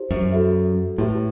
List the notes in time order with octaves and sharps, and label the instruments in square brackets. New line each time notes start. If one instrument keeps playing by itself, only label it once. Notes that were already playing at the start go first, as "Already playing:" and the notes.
Already playing: [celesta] E4 G4 C5
[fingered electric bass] F#2
[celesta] F#4 A4 E5
[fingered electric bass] A2 [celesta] E4 G4 B4 E5